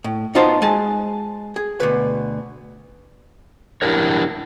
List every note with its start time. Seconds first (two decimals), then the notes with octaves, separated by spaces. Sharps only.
0.04 A2
0.35 B3 D#4 F4 F#4 C5 A5
0.62 G#3 G#5 A5
1.56 G#4
1.80 D2 B2 B4
3.82 D4 E4 G4 A#4 C#5